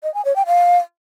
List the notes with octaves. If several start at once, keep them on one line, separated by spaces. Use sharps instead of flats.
D#5
G#5
C#5
G5
F5